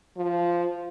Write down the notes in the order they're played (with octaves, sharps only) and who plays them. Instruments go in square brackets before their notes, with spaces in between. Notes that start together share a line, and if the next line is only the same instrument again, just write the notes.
[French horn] F3